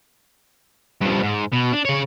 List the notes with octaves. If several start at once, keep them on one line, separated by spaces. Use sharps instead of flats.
G2 F3
G#2
B2
D4
C#3 C#5